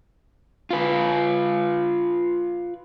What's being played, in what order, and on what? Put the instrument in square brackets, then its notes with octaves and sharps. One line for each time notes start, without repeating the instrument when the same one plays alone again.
[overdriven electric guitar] F4 B4